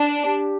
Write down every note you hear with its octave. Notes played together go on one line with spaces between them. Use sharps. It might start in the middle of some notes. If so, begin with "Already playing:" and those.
Already playing: D4
G4